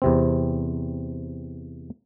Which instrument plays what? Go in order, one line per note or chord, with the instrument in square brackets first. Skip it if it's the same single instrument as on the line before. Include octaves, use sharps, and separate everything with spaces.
[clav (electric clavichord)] E2 C3 C4